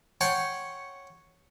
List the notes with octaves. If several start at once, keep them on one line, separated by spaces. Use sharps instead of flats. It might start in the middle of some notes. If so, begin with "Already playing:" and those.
C#5 F#5 G5 A5 C6 C#6